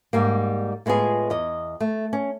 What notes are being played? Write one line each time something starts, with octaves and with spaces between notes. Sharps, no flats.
G#2 G3 A#3
A2 G#3 B3 F4 G#4
E2 D#5
A3
C#4